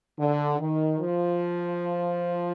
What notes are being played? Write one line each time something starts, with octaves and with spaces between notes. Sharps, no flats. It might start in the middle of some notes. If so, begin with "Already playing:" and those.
D3
D#3
F3